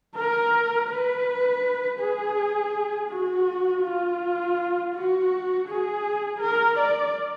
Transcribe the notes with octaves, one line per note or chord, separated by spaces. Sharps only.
A#4
B4
G#4
F#4
F4
F#4
G#4
A#4
D5